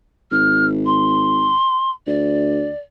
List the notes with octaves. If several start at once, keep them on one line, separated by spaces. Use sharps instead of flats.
G#1 F6
C6
D2 D5